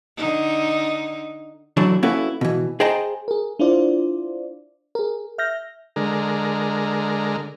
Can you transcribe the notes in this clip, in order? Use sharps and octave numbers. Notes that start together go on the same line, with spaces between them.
D3 D#4
D3 E3 F#3 A3 D4 E4
A#3 C#4 E4 F#4 A4 B4
B2 E3
G#4 C5 D#5 G5 A5 A#5
G#4 A#4
D4 E4 F4 C5 D5
G#4 A#4
E5 F6 G6 A#6
D3 G#3 A#4